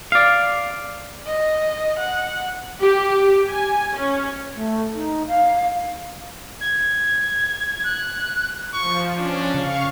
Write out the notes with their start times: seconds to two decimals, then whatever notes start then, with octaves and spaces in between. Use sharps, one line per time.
0.12 D5 F5
1.26 D#5
1.99 F#5
2.81 G4
3.48 G#5
3.95 C#4
4.54 A3
4.93 D#4
5.27 F5
6.61 G#6
7.84 F#6
8.73 F3 C#6
9.18 C#4 D4
9.55 C#3 F5 C#6